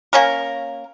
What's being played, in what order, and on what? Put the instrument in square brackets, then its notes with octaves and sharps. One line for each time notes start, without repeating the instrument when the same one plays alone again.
[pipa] A#3 C#4 A#4